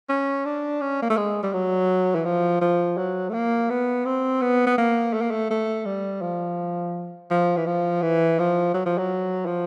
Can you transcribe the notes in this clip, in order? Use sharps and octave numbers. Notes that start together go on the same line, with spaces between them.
C#4
D4
C#4
A#3
A3
G#3
G3
F#3
E3
F3
F3
F#3
A3
A#3
B3
C4
B3
B3
A#3
A3
A#3
A3
A3
G3
F3
F3
E3
F3
E3
F3
F#3
F3
F#3
F3